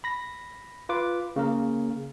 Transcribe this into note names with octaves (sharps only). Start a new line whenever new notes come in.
B5 A#6
F4 B4 D6
C#3 A#3 A#4